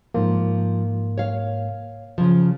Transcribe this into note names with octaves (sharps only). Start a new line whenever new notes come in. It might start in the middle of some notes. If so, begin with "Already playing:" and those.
G#2 F3 A#3
C#5 F5
C#3 F3